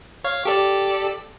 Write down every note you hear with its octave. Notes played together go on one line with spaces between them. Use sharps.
C#5 F5
G4 A4 D5